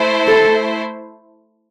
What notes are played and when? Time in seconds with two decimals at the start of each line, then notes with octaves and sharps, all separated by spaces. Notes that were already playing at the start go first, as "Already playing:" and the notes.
Already playing: A3 E4 C5
0.28 A4